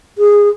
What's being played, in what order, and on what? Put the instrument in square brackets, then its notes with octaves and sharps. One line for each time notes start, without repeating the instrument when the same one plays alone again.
[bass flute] G#4